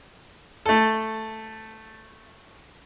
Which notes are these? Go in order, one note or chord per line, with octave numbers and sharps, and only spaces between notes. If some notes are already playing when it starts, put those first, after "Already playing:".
A3 A4